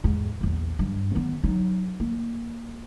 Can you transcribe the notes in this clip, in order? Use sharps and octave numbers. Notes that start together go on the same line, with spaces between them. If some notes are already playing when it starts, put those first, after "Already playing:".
E2 G#2
A#1 E2
G2
D#3 B3
F#3 D#4
A#3